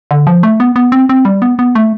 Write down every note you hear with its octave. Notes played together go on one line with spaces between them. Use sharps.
D3
F3
A3
B3
B3
C4
C4
G3
B3
B3
A3